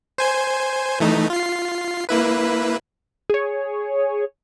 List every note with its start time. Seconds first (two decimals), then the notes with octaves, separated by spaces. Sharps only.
0.18 C5 G#5
1.00 E3 A3 D#4
1.30 F4 C7
2.09 A#3 E4 B4
3.30 G#4 C#5